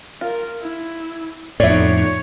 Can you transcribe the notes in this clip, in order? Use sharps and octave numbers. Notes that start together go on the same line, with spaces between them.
F4 A#4
E4
F2 A2 B3 D#4 C#5 D5 E5